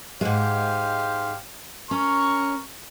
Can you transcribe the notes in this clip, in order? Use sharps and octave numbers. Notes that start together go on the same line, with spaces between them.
G#2 G#3 G4 C5 F5
C#4 A#4 C#6